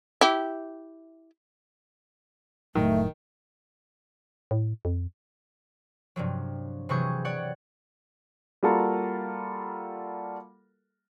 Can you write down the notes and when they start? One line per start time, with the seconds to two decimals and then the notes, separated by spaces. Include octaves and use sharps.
0.21 E4 G4
2.75 F1 A2 D#3 F#3 A3
4.51 A2
4.85 F2
6.16 G2 C3 F3 F#3
6.89 C3 E3 F#3 G#4 C#6 G6
7.25 G4 C#5 D5 F#5
8.63 G3 A#3 F4 F#4 A4 A#4